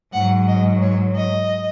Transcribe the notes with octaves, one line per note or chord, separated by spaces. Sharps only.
G#2 F#3 F#5
D#5
C#5
D#5